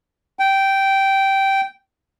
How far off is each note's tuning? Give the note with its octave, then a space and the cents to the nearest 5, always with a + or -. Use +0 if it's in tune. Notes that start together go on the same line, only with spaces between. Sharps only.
G5 -10